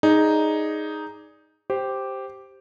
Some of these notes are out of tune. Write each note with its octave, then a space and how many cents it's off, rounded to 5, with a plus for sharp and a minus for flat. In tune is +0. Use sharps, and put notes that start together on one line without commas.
D#4 +0 G#4 +0 D5 +0
G4 -5 C5 +0